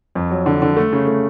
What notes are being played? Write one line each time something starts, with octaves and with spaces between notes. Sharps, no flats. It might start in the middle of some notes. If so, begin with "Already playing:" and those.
F2
F#3
D3
D3
A3
C#3
A3